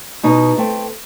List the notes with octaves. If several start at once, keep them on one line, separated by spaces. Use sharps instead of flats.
B2 D#4
A3 C4